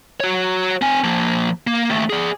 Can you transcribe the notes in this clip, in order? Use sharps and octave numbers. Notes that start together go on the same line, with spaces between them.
F#4 C#5
C4 G#5
F3 A#3
A#3
D#2 A3
G#4 D5